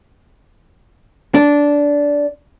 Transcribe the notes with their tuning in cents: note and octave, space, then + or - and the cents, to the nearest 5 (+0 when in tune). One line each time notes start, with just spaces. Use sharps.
D4 -15